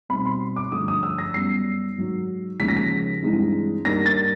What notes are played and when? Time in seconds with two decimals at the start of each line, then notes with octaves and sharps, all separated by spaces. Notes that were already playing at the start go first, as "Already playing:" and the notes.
0.09 B2 G3 C4 D#4 B5
0.25 C6
0.56 D6
0.72 G2 D3 F3 A3 D#6
0.88 D#6
1.03 E6
1.18 A#6
1.34 F#2 D#3 G3 B3 C7
1.98 G#2 D#3 F#3
2.59 D#2 C#3 F3 G#3 B6
2.68 A#6
2.77 B6
3.23 G2 E3 G#3 C4 D#4
3.85 G2 D#3 G3 A#3 D#4 A#6
4.06 A6